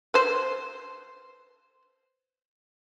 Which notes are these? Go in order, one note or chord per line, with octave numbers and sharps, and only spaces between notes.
B4 C5